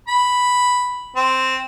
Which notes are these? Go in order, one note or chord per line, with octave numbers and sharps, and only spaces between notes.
B5
C4